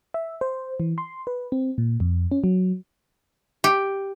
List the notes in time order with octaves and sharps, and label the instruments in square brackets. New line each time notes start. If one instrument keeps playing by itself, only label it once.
[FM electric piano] E5
C5
E3
C6
B4
C4
A#2
F2
C#4
F#3
[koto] G4